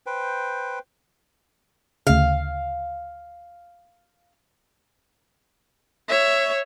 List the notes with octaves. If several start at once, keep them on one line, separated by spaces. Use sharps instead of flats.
B4 C5 G5
D2 C#3 F5
C#5 E5